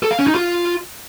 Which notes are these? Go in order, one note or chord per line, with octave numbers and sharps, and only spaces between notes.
A4
F5
C#4
D#4
F4